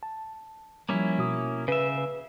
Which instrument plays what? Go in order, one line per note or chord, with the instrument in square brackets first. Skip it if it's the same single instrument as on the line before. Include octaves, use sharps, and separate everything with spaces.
[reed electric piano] A5
[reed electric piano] F3 G3 [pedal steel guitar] A#3 C#4 E4
[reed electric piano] B2 F#4 D#6
[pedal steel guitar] C#3 E5 [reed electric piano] B4
[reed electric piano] B4